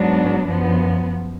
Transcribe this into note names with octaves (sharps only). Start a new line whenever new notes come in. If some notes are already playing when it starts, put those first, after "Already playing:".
Already playing: G#2 F#3 B3 D4
F#2 F3 B3